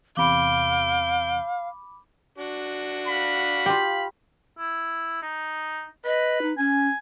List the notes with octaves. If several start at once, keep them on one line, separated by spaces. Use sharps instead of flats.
E2 C3 F5 B5 D6 G6 D7
D4 F#4
F5 B5
F4 G4
E4
D#4
B4 D#5
D#4
C#4 G#5